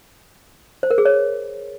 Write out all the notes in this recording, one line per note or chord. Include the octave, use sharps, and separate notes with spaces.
C5
A#4
G#4
C#5